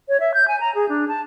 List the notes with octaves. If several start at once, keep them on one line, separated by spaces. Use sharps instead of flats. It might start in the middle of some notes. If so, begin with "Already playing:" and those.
C#5
E5
G6
G#5
A#5
G#4
D4
A5